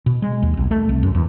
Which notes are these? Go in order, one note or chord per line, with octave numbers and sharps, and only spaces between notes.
B2
G#3
D#2
B1
A3
C2
F#2
E2